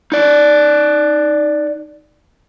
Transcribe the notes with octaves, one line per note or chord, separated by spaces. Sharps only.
D#4 D5